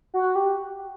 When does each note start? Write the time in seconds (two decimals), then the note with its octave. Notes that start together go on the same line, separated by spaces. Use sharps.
0.14 F#4
0.35 G4